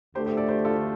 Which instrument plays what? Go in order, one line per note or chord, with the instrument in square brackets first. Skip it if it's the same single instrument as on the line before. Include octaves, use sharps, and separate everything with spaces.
[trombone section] D2 D3 A3 [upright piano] G4 C5
[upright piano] G4 C5
A4 D5
G4 C5
F4 A4